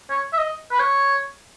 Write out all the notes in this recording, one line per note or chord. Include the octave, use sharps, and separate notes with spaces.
C#5
E5
D#5
B4
C#5